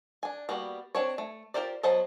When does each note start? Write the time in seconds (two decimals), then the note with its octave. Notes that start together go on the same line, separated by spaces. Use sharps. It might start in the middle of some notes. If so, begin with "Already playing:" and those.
0.23 D4 G#5
0.49 G3 A#3 B3 F#4
0.95 C4 D4 C#5
1.18 A3
1.54 F4 G4 A#4 C5 D5
1.83 F#3 B3 C5 D#5 A5